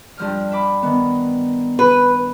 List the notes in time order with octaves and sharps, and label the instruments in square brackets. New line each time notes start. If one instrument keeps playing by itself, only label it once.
[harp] G2 F3 F6
E5 B5 D6
D#3 B3
[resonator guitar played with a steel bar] B4